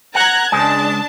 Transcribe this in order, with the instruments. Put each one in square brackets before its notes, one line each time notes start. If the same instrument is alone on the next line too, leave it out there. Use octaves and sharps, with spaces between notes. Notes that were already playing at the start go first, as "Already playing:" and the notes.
[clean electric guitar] F#5 [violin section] A#5 F#6 G#6
[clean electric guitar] C#2 G#3 [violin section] D4 A5